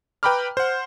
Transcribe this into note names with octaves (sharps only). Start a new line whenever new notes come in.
B4 G5 A#5 B5 D6 F6
C5 F#5